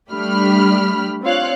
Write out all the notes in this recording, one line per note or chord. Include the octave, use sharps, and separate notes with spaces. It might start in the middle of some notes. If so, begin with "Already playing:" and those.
G3 A3 D4 G4 B5 F6
C4 D4 F4 C#5 F5 F#6